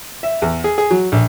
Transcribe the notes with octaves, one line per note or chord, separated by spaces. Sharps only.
E5
E2
G#4
G#4
F#3
A#1